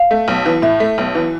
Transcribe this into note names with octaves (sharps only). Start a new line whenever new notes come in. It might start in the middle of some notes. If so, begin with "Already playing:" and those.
Already playing: F5
A3
B1
E3
A2 E5
A3
B1
E3